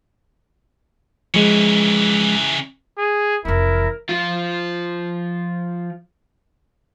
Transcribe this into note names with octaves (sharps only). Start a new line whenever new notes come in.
C#3 E3 F3 G#3
G#4
F1 E3 E4 A#4
F3 F4